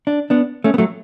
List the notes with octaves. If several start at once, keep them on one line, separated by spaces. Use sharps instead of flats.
D4
B3 D4
A3 C#4
B3
F#3 A3